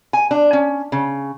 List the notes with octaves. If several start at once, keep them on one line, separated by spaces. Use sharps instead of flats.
G#5
D4
C#4
C#3